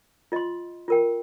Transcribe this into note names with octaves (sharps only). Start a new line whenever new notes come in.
F4 D#5 C6
F4 A#4 G5